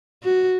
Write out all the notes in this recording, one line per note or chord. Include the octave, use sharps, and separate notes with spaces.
F#4